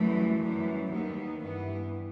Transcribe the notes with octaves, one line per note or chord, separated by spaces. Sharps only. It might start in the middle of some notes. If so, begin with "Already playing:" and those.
Already playing: F#2 E3 G3 A3
F#2 E3 G3
D#2 D#3 G3 B3
G2 E3 G3 B3